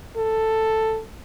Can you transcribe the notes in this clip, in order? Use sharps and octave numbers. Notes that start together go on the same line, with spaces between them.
A4